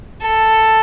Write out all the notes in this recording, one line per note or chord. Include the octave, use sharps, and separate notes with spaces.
A4